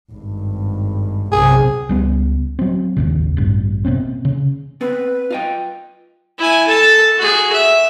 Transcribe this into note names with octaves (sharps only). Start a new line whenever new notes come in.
G#1 G2
B1 C3 G#4
C#2 G3 B3
F#3 C4
G#1 D#2 C#3
A1 G2
B2 A#3 C4 C#4
C#3
B3 C4 B4
F4 D#5 G5
E4 G#5
A4 A5
F#4 G#4
E5